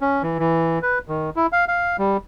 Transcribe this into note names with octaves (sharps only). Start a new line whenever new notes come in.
C#4
E3
E3
B4
D#3
E4
F5
F5
G3